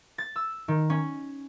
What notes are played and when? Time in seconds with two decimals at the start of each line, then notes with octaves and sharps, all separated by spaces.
0.18 A6
0.36 E6
0.68 D#3
0.90 C#4